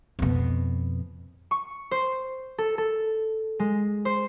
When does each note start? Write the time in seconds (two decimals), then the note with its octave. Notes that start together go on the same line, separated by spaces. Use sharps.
0.19 F2 B2
1.51 C#6
1.91 C5
2.58 A4
2.78 A4
3.59 G#3
4.05 C5